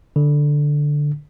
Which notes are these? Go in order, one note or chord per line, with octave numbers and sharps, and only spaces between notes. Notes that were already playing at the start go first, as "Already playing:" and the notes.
D3